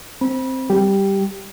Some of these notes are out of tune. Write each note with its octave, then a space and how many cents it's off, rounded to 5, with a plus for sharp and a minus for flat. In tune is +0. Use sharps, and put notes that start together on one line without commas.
C4 +0 B5 -25
G3 +0 G4 +0